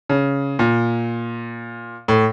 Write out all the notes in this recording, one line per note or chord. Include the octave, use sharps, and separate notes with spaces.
C#3
A#2
A2